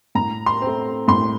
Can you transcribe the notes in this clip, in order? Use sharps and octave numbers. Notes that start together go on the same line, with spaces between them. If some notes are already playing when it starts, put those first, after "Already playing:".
A2 A#5
C6
A3 C4
A2 C6